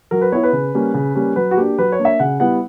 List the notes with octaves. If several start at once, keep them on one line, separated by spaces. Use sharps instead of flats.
F#3 A#4
B4
B3 E4 C#5
B4
C#3
G3 A#3 C#4
C#3
G3 A#3 C#4
F#3 B4
F#4
A#3 D4 G4
F#3 B4
C#5
A#3 D4
E5
C#3 F#5
G3 B3 E4 F#5